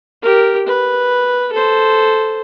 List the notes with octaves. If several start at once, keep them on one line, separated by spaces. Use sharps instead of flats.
G4 A#4
B4
A4 C5